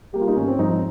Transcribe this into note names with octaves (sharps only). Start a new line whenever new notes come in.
G3 A#3 G4
F4
D#4
G#1 C#4
C4
G#2 F3 D#4
D#4